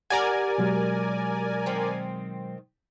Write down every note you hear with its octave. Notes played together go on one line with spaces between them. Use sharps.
G3 A#4 D5 F#5 G#5
B2 F#3 G#3
D#3 C4